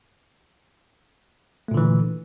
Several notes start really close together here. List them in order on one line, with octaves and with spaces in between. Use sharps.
A3 A#2 D3 E3